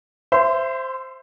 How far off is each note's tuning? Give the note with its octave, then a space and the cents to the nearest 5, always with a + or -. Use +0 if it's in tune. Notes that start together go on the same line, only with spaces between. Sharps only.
C5 +0 E5 +20 C6 -30